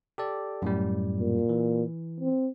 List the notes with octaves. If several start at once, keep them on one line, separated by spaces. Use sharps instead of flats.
G4 A4 D5
F#2 A2 G3
A#2
E3
C4